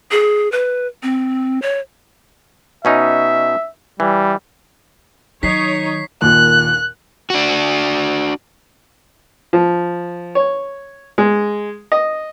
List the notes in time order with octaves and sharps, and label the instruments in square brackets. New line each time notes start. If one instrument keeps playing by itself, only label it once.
[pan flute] G#4
B4
C4
C#5
[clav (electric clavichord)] B2 C#4 D#4 [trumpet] E5
[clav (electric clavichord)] E3 [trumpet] G3
[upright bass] D#3 F#3 [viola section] D#4 C#5 [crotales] B6 C7
[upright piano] D#2 A#2 [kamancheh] F#6
[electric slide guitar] D4 F#4
[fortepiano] F3
C#5
G#3
D#5